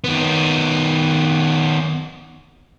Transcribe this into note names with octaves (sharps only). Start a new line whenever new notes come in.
D#3 B3